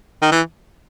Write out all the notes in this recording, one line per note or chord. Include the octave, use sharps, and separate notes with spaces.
D#3
E3